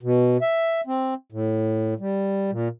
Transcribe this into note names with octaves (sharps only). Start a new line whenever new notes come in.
B2
E5
C4
A2
G3
A#2